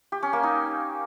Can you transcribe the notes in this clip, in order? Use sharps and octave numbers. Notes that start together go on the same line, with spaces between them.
G4
C#4
A#3
D#4